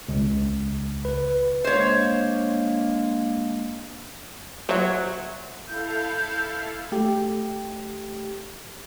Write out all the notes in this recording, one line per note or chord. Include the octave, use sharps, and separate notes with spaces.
C#2
B4
G#3 A#3 D4 C5 C#5
F#3 C5 E5
E4 A4 F5 G6
A3 G4